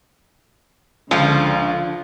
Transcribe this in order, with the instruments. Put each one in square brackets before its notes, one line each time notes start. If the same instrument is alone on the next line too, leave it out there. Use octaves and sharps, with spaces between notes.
[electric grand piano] C#2 [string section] D3 [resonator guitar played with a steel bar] F3 [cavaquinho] F4 A4 F5